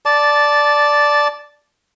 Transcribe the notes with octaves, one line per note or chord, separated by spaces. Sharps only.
D5 A5